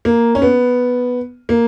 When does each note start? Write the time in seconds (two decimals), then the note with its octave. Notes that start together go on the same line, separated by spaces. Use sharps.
0.05 A#3
0.35 C#4
0.42 B3
1.49 A#3